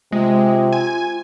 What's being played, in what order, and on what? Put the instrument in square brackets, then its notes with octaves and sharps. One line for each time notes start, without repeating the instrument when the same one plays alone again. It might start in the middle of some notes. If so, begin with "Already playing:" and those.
[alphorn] C3 [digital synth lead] G#3 [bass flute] F4
[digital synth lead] G#5